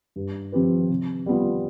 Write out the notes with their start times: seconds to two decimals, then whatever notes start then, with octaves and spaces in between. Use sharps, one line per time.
0.16 G2
0.52 F3 C4 G4 B4
0.90 C3
1.26 G3 B3 F4